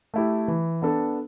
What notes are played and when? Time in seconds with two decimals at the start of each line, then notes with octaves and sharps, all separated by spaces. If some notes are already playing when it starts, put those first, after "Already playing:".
0.14 A3 E4 G4
0.48 E3
0.82 B3 D4 A4